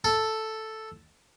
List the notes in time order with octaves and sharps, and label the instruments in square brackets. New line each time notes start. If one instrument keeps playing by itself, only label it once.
[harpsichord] A4